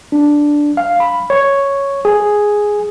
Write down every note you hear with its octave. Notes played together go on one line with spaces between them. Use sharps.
D4
F5
B5
C#5
G#4